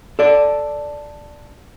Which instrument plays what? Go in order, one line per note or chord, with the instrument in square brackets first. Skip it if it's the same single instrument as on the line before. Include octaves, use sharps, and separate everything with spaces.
[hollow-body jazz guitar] A4 D5